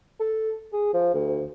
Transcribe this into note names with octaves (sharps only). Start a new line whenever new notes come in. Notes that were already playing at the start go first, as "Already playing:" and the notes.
A4
G#4
F3
D2